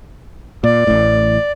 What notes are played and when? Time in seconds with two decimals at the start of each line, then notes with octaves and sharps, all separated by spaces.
0.64 A#2 D5
0.87 A1 A2